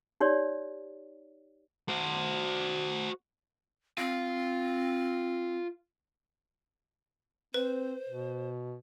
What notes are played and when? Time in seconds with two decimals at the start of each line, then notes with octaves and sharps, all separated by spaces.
0.21 D#4 G4 C#5 D5
1.88 F#4 C5
3.98 C4 F4
7.54 C4 B4 C5
8.09 B2